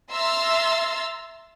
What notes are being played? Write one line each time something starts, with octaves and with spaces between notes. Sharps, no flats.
E5 A#5 C6 E6 F6 A6